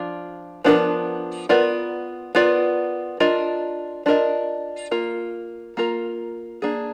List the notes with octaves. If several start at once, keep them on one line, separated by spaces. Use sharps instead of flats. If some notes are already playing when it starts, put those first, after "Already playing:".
Already playing: F3 D4 F4
F3 B3 D4 F4 A#4
B3 F4 A#4 D5
B3 F4 A#4 D5
D4 F4 A#4 D#5
D4 F4 A#4 D#5
A#3 F4 A#4
A#3 F4 A#4
A#3 D4 G#4